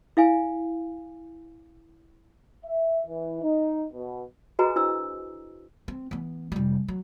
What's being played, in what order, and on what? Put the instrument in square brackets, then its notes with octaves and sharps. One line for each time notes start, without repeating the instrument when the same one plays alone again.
[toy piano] E4 F5 G#5
[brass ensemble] E5
E3
D#4
B2
[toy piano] F#4 G#4 B4 D#5 G#5 A#5
D4 E4 C5 E6
[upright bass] C4
E3 B3
F1 G3
F#3